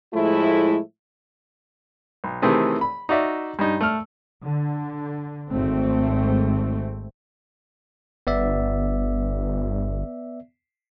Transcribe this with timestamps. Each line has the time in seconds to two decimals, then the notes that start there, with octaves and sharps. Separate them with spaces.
0.13 A2 F3 G#3 A3 E4
2.24 B1
2.42 C3 D#3 E3 A3 C4 G#4
2.81 B5
3.09 D#4 F#4 D5 E5
3.59 G2 D#4
3.81 A3 F6
4.43 D3
5.50 G#1 A3 C4
8.27 G1 B3 D5 E5